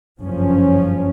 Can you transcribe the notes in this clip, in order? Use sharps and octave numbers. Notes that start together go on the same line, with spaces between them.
F#1 G2 F3 C#4